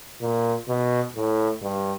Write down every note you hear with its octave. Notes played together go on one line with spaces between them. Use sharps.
A#2
B2
A2
G2